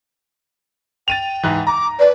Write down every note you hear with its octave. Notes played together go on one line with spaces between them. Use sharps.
G5 A6 D#7 F7
G#2 E3
A#5 D6
B4 D5